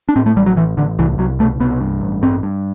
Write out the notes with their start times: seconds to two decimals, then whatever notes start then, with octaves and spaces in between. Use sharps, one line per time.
0.09 D4
0.16 A2 C4
0.26 A3
0.36 A1 G3
0.46 F#3
0.57 A1 E3
0.77 A1 D3
0.99 C2 E3
1.18 C2 F#3
1.39 B2 A3
1.60 C2 B3
1.81 G2
2.01 A1
2.22 G2 C4
2.43 G2